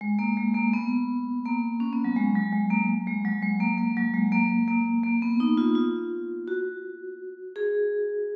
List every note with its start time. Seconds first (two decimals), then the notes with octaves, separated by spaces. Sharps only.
0.01 G#3
0.19 A#3
0.37 G#3
0.54 A#3
0.73 B3
1.45 A#3
1.80 C#4
1.93 B3
2.04 F#3
2.16 G#3
2.35 F#3
2.53 G#3
2.71 A#3
3.07 G#3
3.25 F#3
3.42 G#3
3.60 A#3
3.78 A#3
3.97 F#3
4.14 G#3
4.32 A#3
4.68 A#3
5.04 A#3
5.22 B3
5.40 D#4
5.57 F4
5.75 F4
6.48 F#4
7.56 G#4